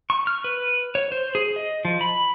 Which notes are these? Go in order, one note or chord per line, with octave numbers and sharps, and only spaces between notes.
C#6
F6
B4
C#5
C5
G#4
D#5
F3
B5